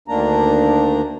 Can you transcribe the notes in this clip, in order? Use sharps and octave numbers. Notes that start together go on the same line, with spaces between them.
D2 D#3 A#3 D4 A#5